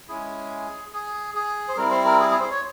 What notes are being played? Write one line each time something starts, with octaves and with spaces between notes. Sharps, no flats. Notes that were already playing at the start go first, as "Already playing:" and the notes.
G#3 C#4 E4 G#4
G#4
G#4
C5
G3 C4 E4 A#4
C5
A#4
G#4
G#4
C5
C#5